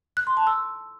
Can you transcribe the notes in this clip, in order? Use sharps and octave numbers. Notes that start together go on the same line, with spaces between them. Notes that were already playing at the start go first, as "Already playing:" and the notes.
F#6
C6
A5
E6